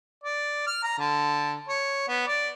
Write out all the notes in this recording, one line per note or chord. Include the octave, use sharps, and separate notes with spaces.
D5
F6
A#5
D3
C#5
B3
D5